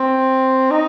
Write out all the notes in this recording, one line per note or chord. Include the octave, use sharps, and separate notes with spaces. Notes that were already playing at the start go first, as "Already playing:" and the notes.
Already playing: C4
D#4